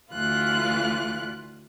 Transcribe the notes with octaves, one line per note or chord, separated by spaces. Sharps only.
D2 E3 F4 F5 F#6